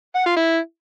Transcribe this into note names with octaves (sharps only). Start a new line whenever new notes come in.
F#5
F4
E4